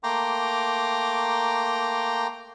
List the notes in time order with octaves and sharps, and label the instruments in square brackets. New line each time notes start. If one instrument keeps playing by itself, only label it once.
[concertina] A3 A#3 G5 A#5 C6 D6